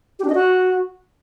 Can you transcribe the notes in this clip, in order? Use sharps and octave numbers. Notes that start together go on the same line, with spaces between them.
G4
D4
D#5
F#4